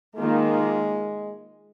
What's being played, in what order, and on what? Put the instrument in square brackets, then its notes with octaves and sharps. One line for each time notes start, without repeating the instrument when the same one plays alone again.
[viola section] D#3 A#3 F4 [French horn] G#3